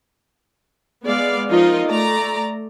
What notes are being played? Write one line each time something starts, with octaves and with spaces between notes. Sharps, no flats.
G#3 B3 D5 F5
F3 D#4 F4 A#4 D#5
A3 D5 A#5